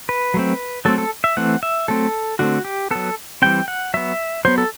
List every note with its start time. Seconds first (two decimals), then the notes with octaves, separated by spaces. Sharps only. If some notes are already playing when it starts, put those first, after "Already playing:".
0.09 B4
0.34 F#3 A3 C4
0.85 F#3 A3 C4 A4
0.98 A4
1.24 E5
1.37 E3 A3 C4 F#5
1.63 E5
1.88 F#3 A3 C4 A4
2.39 D3 A3 C4 F#4
2.65 G4
2.91 F#3 B3 A4
3.42 E3 G3 C4 G5
3.68 F#5
3.94 F#3 B3 E5
4.45 F#3 B3 C5
4.58 A4